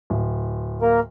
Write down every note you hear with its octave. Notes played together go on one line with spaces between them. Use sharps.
D1
A#3 A#4